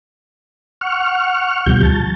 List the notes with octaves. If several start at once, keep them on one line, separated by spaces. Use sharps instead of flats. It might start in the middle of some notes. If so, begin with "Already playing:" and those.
F#5 C#6 F6
D2 B2 F3 G3 G6
A5